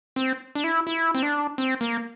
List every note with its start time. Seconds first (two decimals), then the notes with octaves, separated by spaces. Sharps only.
0.16 C4
0.55 D4
0.64 E4
0.87 E4
1.15 C4
1.23 D4
1.58 C4
1.81 A#3